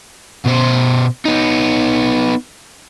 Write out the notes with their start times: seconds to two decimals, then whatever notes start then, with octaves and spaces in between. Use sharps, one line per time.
0.45 B2 C5
1.26 B3 D#4